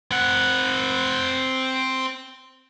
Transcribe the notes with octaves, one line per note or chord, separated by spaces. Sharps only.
C4 F#5